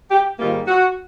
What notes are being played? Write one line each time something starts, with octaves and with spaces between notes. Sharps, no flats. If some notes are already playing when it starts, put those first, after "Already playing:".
G4
G#2 D#3 G3 A#3 F4
F#4